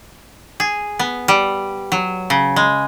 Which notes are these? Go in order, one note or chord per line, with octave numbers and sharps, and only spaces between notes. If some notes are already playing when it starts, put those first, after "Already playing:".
G#4
B3
G3
F#3
C#3
G#3